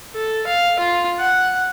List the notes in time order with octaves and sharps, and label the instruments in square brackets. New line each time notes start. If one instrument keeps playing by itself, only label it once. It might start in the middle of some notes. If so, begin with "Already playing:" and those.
[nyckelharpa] A4
F5
F4
F#5